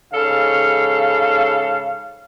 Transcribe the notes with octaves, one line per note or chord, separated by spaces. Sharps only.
G#2 C#3 A4 F5